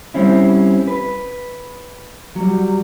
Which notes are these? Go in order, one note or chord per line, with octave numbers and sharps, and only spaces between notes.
G3 C4 C#4 E4
B4
F#3 G3